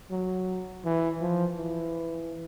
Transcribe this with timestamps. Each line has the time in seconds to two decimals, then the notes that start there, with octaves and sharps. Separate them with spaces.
0.11 F#3
0.85 E3
1.21 F3
1.57 E3